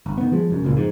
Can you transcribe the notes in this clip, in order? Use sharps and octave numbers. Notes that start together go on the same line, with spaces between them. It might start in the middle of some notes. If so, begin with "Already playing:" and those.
G1
D#3 B3
F3 G#3
F1 F#2
F#1 C#2 A#2
F2 G#2